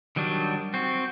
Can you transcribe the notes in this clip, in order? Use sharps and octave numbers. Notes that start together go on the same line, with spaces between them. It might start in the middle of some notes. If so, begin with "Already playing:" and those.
D#3 F#3 G3 D4
C4 F#4